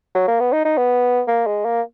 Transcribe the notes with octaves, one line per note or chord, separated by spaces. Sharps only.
F#3
A#3
B3
D#4
D#4
B3
A#3
G#3
A#3